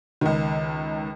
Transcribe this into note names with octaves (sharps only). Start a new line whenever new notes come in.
C#2 D#3